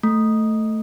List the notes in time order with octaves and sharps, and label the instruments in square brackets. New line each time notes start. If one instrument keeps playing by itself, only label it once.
[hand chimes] A3